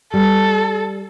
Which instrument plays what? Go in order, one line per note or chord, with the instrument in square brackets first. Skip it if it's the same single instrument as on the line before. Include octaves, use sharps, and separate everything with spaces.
[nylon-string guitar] G3 [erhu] A4